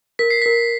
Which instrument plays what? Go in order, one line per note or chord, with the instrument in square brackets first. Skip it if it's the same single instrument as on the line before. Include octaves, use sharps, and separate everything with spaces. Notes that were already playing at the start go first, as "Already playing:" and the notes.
[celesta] A#4 [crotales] B6
[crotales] C7
[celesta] A#4 [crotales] B6